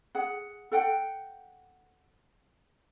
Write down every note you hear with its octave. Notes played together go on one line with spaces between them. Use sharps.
G#4 F#5
A4 F#5 G5